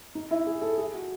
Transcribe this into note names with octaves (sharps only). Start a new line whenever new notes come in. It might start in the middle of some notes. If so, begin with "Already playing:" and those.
D#4
E4
G#4
A4
G#4
F#4